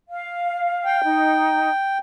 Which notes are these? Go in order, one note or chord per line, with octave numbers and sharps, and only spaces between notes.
F5
G5
D#4